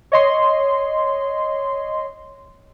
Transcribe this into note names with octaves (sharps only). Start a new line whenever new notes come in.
C#5 D#5 C6